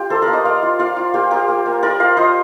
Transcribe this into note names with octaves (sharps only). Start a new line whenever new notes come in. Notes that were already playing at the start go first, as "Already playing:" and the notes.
Already playing: F4 G4
A#3 A4 C5
A#4 D5
A#3
C5 D#5
A#3 D5 F5
F4
F4 D5 F5
F4
A#3 G4
F4 G4 A#4
A#3
A#3
F4 A#4 D5
F4 D5 F5
F4 C5 D#5